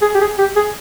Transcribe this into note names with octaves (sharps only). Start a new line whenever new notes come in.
G#4
G4
G#4
G4
G#4